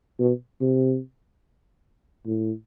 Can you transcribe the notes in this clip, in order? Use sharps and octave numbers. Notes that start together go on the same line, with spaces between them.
B2
C3
A2